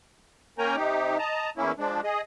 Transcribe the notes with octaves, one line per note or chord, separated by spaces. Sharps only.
A#3 C#4 A#4 G5 G#5 A#5
C3 D#4 G4
D#5 A5 A#5
E2 A#3 C#4 E4
F3 G#3 D4
G#4 D#5